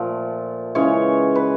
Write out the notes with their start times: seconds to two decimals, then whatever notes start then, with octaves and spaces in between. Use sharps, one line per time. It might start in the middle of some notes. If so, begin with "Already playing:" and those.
Already playing: A#2 F3 A3
0.75 C#3 E3 G#3 C#5
1.35 B4